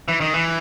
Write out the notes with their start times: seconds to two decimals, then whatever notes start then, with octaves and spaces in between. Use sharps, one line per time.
0.08 E3
0.21 D#3
0.34 E3